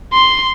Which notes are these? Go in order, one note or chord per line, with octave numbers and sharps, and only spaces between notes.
C6